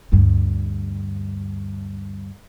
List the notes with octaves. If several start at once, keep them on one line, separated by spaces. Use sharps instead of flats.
D2 G2